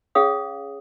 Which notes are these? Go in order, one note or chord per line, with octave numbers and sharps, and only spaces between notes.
C#4 G#4 C#5 F5 D#6